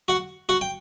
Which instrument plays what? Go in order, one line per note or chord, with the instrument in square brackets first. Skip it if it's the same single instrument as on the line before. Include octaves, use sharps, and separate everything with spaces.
[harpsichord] F#4 F#5
F#4 F#5
G5